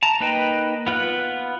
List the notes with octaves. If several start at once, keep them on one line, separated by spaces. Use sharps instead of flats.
A5 A#5
A#3 D#4 B4 D#5 G5
B3 F4 B4 F#6